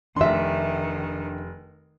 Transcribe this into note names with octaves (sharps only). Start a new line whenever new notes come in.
F1 D#3 D4 E5 C6